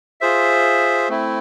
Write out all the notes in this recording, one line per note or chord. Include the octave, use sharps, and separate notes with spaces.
F4 G#4 C5 E5
A3 C4 E4